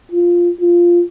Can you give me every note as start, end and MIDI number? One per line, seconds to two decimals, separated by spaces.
0.12 0.50 65
0.61 1.03 65